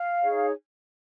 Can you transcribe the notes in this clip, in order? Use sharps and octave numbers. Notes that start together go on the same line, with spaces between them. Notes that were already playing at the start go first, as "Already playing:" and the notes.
Already playing: F5
D#4 G#4 C#5